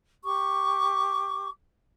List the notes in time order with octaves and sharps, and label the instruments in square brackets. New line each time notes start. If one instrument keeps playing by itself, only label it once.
[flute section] G4 C#6 D6